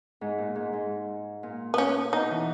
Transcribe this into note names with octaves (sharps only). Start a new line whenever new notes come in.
G#2
A#2
G#2
G#2
A#2
B3
C#4
B2 D#4
E3